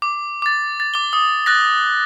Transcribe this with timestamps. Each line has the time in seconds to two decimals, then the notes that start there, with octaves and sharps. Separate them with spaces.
0.02 D6
0.42 D6 A6
0.80 A6
0.94 D6 G7
1.13 D#6
1.46 F#6 A6 A#6